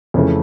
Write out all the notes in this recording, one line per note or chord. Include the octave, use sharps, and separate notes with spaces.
F2 C#3 E3 A3